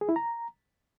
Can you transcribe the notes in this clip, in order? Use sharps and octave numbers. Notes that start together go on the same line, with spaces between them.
G#4
E4
A#5